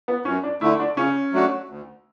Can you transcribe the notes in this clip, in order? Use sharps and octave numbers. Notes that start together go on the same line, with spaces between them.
B3
F#2 C#4
D4
D3 A3 E4
D4
C#3 C#4
F#3 A3 D4 F#4
D2